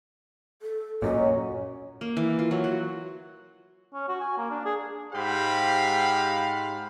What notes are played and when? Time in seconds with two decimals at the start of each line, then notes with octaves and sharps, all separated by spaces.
0.62 A4
1.02 F#2 A#2 F#3 C#4 D#5
2.01 A#3
2.17 E3
2.39 F4
2.51 F#3
2.64 F#4
3.94 C#4
4.09 F#4
4.21 G#5
4.38 A#3
4.51 D4
4.66 G#4
5.13 G#2 G4 C5 F5 F#5 B5